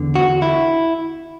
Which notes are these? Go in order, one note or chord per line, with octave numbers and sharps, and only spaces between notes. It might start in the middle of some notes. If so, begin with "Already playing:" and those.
Already playing: E2 D3
F#4
E4